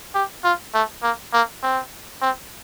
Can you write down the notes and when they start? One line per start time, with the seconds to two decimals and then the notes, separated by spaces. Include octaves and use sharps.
0.15 G4
0.44 F4
0.74 A3
1.03 A#3
1.33 A#3
1.62 C4
2.21 C4